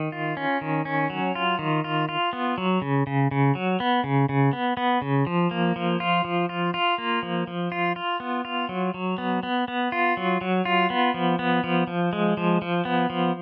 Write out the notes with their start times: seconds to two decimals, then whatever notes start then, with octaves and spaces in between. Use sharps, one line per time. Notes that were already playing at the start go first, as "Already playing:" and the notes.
Already playing: D#3
0.12 F4
0.37 C#4
0.61 D#3
0.85 C#4
1.10 F#3
1.35 F4
1.59 D#3
1.84 F4
2.09 F4
2.33 B3
2.58 F#3
2.82 C#3
3.07 C#3
3.31 C#3
3.55 F#3
3.80 B3
4.04 C#3
4.29 C#3
4.53 B3
4.77 B3
5.02 C#3
5.27 F3
5.51 A#3
5.76 F3
6.00 F4
6.25 F3
6.49 F4
6.74 F4
6.98 A#3
7.23 F3
7.47 F3
7.72 F4
7.96 F4
8.20 B3
8.45 F4
8.69 F#3
8.94 F#3
9.18 B3
9.43 B3
9.68 B3
9.92 F4
10.17 F#3
10.41 F#3
10.65 F4
10.90 B3
11.14 F3
11.39 B3
11.64 F3
11.87 F3
12.13 G#3
12.37 F3
12.62 F3
12.85 B3
13.10 F3